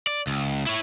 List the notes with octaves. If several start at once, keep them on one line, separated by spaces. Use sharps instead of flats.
D5
C#2
E4 C#5